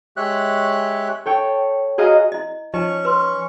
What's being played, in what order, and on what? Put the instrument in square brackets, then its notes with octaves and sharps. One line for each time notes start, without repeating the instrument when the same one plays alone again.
[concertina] G#3 G4 C#5 E5 F#6
[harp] A4 C#5 G5
F#4 G#4 D#5 F5 A#5 D#6
[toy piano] E4 D#5
[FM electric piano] F3 [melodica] C#4 C#6 [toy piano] D#4 D#5
[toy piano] B4 C6